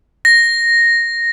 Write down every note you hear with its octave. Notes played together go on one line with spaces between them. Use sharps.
A#6